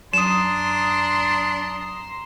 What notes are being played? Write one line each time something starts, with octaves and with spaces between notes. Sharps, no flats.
F#2 D4 A#5 C6 D#6 E7